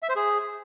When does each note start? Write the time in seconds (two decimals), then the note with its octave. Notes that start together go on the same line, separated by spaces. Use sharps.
0.03 E5
0.09 C5
0.16 G#4